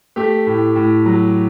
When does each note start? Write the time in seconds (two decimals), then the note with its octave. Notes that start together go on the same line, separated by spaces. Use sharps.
0.16 A3 G4
0.47 A2
0.76 A2
1.06 F#3